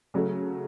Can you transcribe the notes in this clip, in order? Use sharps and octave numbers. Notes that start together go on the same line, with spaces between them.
C#3 F#3 A3